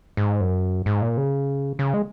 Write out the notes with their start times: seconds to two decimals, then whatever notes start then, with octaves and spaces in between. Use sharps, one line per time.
0.17 G#2
0.41 F#2
0.86 G#2
1.02 A#2
1.17 C#3
1.79 C#3
1.94 G#3